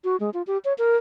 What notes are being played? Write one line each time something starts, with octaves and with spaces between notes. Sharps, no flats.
F#4
G#3
F4
G4
C#5
A#4